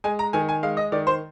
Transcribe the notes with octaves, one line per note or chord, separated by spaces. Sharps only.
G#3 G#5
A#5
D#3 G#5
G#5
G#3 F5
D#5
D#3 D5
C5